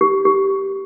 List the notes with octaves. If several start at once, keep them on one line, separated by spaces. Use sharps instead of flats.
G4
G4